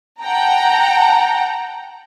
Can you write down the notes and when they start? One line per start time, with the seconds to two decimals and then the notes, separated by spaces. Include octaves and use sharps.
0.22 F#5 G5 A5 A#5